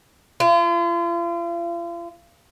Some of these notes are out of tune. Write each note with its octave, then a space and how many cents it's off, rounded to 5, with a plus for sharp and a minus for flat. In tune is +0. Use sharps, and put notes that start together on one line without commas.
F4 -40